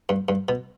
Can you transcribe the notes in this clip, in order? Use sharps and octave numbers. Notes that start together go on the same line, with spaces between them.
G2
G2
B2